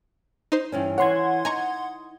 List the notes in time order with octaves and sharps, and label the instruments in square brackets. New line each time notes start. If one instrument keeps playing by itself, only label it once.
[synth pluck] D#4 C5
[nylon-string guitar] G2 E3 C#4
[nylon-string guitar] E3 C#5 [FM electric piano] F#5 C6 G#6
[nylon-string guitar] D#4 [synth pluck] G#5 A#5 C#6